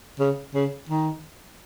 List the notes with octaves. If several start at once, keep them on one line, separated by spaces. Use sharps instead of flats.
C#3
C#3
D#3